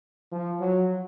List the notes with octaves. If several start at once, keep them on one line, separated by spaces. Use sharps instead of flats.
F3
F#3